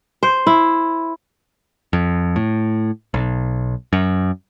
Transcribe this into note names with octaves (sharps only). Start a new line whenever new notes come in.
C5
E4
F2
A2
B1
F#2